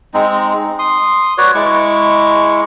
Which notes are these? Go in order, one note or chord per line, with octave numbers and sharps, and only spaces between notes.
G#3 C4 D#4
C6 D#6
F#4 B4 C#5 D5
G#3 E4 C#6 D6